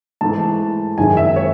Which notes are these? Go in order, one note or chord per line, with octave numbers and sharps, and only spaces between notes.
G#2 E3 A3 A5
G#1 F#2 D#3 G#3 G#5
E5
C#5